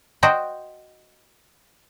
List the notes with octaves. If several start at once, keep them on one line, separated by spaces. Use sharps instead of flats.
F#4 C5 D#5 F#5 G5